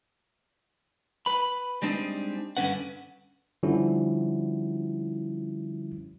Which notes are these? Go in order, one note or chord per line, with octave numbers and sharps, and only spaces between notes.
B4 B5
G3 G#3 C4 D4 D#4
G2 D3 C#4 B4 F#5
D3 F3 G3 C#4 E4 F#4